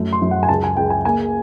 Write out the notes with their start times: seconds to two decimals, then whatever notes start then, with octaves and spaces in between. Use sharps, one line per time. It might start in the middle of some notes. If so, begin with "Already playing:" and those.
Already playing: F#2 A3
0.13 C6
0.22 F#2
0.31 F#5
0.43 G#5
0.49 C#2 A5
0.64 G#5
0.77 C#2 G5
0.90 G#5
1.05 A#3 G#5